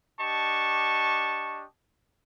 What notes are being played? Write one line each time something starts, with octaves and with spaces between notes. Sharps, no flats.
D4 G4 D#5 A5 C#6